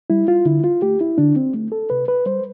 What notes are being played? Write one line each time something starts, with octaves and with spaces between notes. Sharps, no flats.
G3 E4
F4
D3 E4
F4
A3 G4
E4
D3 D4
C4
A3
A4
C3 B4
B4
G3 C5